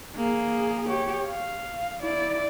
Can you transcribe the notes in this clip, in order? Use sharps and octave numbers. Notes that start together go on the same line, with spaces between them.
A#3 G#4
G4 C#5
F5
E4 D5